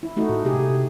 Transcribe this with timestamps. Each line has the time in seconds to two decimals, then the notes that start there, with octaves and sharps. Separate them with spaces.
0.03 E4
0.16 A3 D#4 F#4
0.29 A2
0.45 C3 G4 G#4